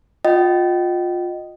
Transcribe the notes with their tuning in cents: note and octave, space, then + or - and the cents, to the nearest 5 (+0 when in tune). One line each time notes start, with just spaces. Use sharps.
F4 +20 D#5 -10 G5 -35